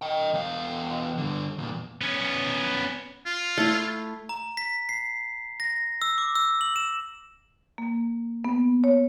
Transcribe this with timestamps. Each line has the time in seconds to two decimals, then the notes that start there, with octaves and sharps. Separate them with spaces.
0.02 D#5 G5
0.34 E2 F5
1.18 G2 D3
1.58 E2 A#2
2.01 B3 C#4
3.26 F4
3.58 A3 E4
4.29 A#5
4.57 B6
4.89 C7
5.60 A#6
6.02 E6
6.18 D6
6.35 E6
6.61 F#7
6.76 E7
7.78 A#3
8.45 B3
8.84 C#5